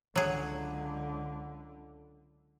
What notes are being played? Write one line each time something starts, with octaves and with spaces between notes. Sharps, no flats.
C#2 D3 F#3 G#4